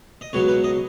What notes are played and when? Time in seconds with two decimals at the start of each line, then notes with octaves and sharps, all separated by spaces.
0.21 D#5
0.33 C#2 B2 F#3 B3 C#5
0.48 B4
0.64 D#5